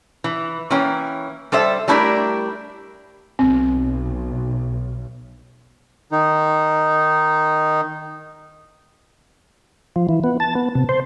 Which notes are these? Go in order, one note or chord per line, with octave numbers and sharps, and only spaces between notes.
E3
E3 A#3 C#4 G5
G3 A4 C5 E5
G3 A3 D4 E4 G4 A#4
B1 C4
D#3 D#4
F3
E3
B3
A5
B3
C3
C5